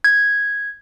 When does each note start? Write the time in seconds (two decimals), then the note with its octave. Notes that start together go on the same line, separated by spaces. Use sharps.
0.04 G#6